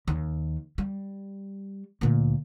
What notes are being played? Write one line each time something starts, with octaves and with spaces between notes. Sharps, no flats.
D#2 D#3
G3
D2 A#2